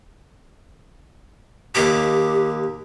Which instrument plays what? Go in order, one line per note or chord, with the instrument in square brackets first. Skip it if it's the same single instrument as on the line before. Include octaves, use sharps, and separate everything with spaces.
[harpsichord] D#2 D6 [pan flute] G4